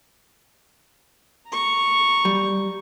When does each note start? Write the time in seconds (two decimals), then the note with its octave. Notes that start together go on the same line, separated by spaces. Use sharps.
1.49 A#5 C#6
2.25 G3